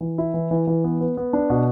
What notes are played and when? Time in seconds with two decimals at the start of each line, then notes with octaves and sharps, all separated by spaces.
0.01 E3
0.18 E4
0.34 E3
0.51 E3
0.67 E3
0.84 B3
1.01 B3
1.17 B3
1.33 D4
1.50 B2